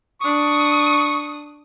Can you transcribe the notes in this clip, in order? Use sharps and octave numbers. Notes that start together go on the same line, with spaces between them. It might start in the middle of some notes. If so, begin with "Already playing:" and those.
D4 C#6 D#6